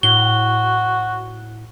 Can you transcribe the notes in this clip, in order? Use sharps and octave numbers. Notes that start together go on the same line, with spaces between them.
A2 F#4 G7